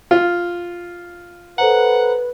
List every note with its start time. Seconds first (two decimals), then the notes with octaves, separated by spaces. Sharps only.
0.11 F4
1.58 A4 B4 C5 F#5 A#5